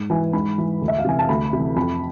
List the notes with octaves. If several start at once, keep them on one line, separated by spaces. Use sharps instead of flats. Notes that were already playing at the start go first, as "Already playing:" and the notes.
Already playing: G#2
E3 G#5
G#2 B5
E3
D2
E5
F5
C3 E3 G#5
A5
D2 B5
C3 E3
F2 B5